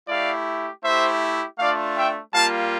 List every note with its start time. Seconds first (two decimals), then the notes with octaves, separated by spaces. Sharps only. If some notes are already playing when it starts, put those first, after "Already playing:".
0.08 A3 E4 G4 D5 F5
0.84 A3 E4 G4 C5 E5
1.59 A3 D4 F4 D5 F5
1.96 E5 G5
2.34 G3 A#3 F4 F5 A5